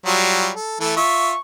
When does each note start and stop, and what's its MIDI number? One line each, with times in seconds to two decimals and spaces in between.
0.06 0.49 54
0.06 0.49 55
0.06 0.49 65
0.55 0.78 69
0.80 0.96 52
0.80 0.96 57
0.80 0.96 69
0.96 1.33 65
0.96 1.33 76
0.96 1.38 85